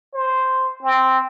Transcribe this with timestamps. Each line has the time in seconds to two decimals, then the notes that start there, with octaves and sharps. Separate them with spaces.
0.14 C5
0.83 C4